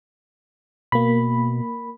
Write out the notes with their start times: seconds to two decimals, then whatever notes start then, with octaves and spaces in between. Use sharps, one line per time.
0.92 B2 A#3 B5